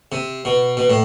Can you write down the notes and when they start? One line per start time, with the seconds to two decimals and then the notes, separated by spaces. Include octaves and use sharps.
0.12 C3
0.45 B2
0.77 B2
0.90 A2